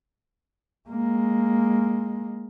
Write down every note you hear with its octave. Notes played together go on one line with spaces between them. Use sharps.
G#3 A#3